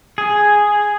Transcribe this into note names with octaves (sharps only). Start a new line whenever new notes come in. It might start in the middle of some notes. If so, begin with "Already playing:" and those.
G#4